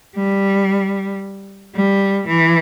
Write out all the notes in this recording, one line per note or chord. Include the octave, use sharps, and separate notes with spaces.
G3
G3
E3